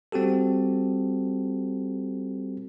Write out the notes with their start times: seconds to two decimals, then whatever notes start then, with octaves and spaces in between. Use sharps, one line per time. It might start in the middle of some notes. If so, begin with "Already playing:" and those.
0.12 G3 C4 F#4 G4 A4